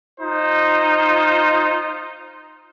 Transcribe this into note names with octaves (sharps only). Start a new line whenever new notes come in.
D#4 F4 C5